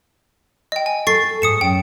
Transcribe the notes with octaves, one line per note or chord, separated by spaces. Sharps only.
D#5 G5
G#5
A4 C#6 A6 C7
G#2 D#6 C#7 E7
F#2 G5